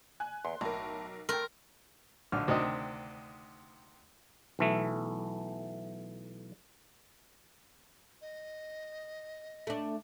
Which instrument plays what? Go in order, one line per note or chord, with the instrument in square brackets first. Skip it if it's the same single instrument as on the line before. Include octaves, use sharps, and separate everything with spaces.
[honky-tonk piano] G#5 F#6
[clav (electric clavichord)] E2 [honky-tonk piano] C6
[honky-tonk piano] B1 A#4 [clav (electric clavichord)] A2
[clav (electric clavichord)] A3 [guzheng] A#4 [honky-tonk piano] G5 C6
[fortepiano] A#1 D3 F6
D2 C3 D#3 D4 D#5
[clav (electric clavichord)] B1 E3 A3
[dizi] D#5
[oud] A3 D4